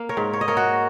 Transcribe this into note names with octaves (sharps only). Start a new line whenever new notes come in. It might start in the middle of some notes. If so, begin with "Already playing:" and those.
Already playing: A#3 F5
A#4 C#5
G#2
C#5
D#5
A#3 A#4 C#5
F#4